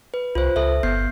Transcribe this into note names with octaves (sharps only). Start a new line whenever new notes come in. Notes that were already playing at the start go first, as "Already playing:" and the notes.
B4
C2 F4 C5
C#2 A4 E5
G1 B3 G6 C7